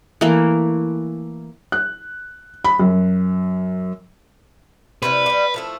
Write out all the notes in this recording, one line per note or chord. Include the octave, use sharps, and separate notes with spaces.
E3 A3 A#3
F#6
B5
F#2
C3 G3 E4 B4
G3 B3
F3 A3 E4